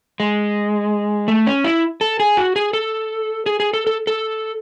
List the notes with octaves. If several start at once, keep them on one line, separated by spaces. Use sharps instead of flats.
G#3
A3
C#4
E4
A4
G#4
F#4
G#4
A4
G#4
G#4
A4
A4
A4